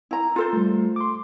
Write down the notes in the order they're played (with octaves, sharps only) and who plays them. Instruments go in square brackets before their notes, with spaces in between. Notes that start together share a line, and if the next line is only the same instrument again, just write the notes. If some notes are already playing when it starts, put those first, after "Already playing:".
[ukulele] E4 A#5
F4 A4 C5
[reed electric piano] G3 A3
C6 D6